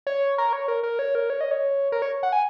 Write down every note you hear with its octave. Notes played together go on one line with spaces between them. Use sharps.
C#5
A#4
C#5
A#4
A#4
C#5
A#4
C#5
D#5
C#5
A#4
C#5
F#5
G#5